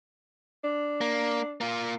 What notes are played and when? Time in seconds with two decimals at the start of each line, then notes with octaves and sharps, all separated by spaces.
0.64 D4
1.01 A#3
1.61 A#3 F4